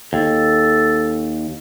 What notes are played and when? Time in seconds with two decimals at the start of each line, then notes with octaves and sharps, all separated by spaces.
0.13 D#2 A4